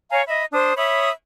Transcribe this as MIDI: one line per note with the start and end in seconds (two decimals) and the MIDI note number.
0.11 0.22 73
0.11 0.22 77
0.11 0.22 80
0.11 0.22 82
0.27 0.44 75
0.27 0.44 76
0.27 0.44 83
0.52 0.73 62
0.52 0.73 72
0.52 0.73 87
0.76 1.10 73
0.76 1.10 76
0.76 1.10 83
0.76 1.10 87